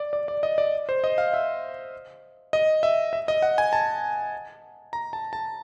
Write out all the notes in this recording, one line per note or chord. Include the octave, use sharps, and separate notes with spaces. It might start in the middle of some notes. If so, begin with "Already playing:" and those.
Already playing: D5
D5
D5
D#5
D5
C5
D#5
F5
E5
D#5
E5
E5
D#5
F#5
G#5
A5
A#5
A5
A5